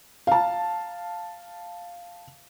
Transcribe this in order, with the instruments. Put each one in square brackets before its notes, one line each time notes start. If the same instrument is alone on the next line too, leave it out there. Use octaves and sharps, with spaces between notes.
[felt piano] F5 A5